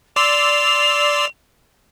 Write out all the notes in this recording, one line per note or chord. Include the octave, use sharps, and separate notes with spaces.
D5 C6 E6 F7